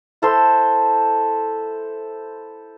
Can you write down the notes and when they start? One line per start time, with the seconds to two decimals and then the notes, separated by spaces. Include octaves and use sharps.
0.22 E4 A4 C5 C6